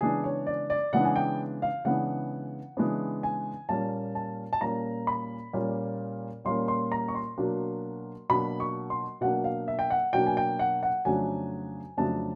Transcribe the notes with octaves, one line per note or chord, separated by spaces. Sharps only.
C#3 E3 G#3 B3 D4 G#4
C#5
D5
D5
C#3 E3 G#3 B3 D4 F#5
G#5
G5
F5
C#3 E3 G#3 B3 D4 F#5
C#3 E3 G#3 B3 D4
G#5
A#2 G3 A#3 C#4 A5
A5
A5
A#2 G3 A#3 C#4 A#5
B5
A#2 G3 A#3 C#4
A#2 G3 A#3 C#4 C6
C6
A#5
C#6
C6
B2 F#3 A#3 D4
B2 F#3 A#3 D4 B5
C#6
C6
B2 F#3 A#3 D4 F#5
F5
E5
G5
F#5
B2 F#3 A#3 D4 G5
G#5
G5
F#5
F#5
F2 C#3 F#3 A3 D4 G#5
F2 C#3 F#3 A3 D4 A5